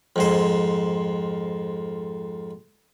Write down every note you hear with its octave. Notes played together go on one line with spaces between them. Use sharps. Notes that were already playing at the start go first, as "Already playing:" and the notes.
F2 G#2 C5